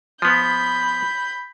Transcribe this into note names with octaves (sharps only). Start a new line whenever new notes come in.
F3 B3 B5 G6